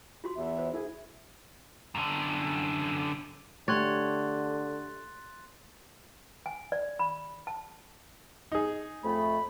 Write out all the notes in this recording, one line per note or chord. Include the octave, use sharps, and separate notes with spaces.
F4 F#4 C6
E2 E5
C5
E4 G#4
F#2 D3
D3 A3 G4 C#5 C6 F#6 A6
G#5
D5
B5
A5
D#4 G#4
F2 A3 B5